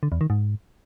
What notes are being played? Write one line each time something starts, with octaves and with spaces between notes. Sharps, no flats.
D3
E2
D#3
G#2